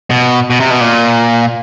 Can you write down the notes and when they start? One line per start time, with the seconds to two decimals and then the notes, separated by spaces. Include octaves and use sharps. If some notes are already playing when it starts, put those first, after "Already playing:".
0.10 B2
0.50 B2
0.60 C3
0.70 B2
0.81 A#2